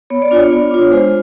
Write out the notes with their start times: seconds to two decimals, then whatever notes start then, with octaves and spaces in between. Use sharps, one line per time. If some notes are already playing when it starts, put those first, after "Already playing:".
0.10 B3 C#5
0.22 D5
0.31 D4 F4 C#5
0.52 B3
0.71 D4 F4
0.91 G#3 C5